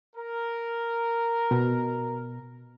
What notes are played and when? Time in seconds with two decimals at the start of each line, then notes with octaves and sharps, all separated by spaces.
0.15 A#4
1.51 B2